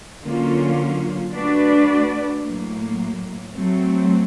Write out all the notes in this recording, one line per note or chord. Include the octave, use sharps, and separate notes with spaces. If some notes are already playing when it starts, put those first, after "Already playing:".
D3 F#3 A#3 C#4 F4
A3 D4 F#4 B4 D5
A2 F#3 A#3
F#3 A3 C4